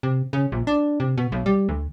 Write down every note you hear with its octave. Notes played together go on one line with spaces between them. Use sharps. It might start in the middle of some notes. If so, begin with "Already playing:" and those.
C3
C#3
A#1
D4
C3
B2
B1
G3
D2